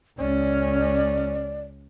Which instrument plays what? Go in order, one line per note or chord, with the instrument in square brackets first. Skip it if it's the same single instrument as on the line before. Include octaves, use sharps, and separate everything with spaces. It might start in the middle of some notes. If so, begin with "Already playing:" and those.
[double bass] C#2 C#4 [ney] D5